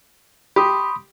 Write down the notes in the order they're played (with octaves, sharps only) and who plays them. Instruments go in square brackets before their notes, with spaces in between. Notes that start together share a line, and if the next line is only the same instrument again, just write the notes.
[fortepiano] G4 [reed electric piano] B5 C6 D#6